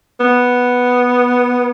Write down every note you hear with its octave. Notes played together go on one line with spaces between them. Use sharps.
B3